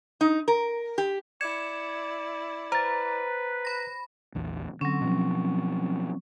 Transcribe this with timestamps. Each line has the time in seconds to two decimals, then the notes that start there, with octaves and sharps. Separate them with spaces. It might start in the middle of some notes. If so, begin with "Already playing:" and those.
0.21 D#4
0.48 A#4
0.98 G4
1.41 E4 D5 G#6 C#7 E7
2.72 B4 C5 A#5 A6
3.65 B5 A#6
4.35 A#1 E2
4.81 D3 F#3 C4 C#4
5.01 B2 F3